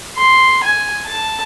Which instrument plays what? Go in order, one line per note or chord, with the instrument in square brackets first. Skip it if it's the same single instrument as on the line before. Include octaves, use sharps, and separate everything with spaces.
[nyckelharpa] C6
G#5
A5